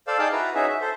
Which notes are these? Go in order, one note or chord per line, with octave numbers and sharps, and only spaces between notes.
A4 C5 D5 F5 E6
D#4 G#4 D5 F5 G5 A5
E4 F#4 B4 A#5
C#4 D#4 F#4 G#4 E5
E5
A4 C5